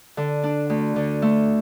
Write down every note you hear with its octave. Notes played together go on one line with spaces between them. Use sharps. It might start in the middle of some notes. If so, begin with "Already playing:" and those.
D3
D4
D2
D3
A3